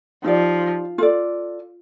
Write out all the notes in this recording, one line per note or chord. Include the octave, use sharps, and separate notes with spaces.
F3 D#4 G4 D5
F4 A4 D5